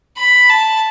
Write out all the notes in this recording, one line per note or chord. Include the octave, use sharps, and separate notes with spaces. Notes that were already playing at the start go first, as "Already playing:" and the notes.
B5
A5